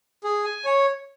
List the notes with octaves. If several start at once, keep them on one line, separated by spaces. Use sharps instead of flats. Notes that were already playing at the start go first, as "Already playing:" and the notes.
G#4
G#5
C#5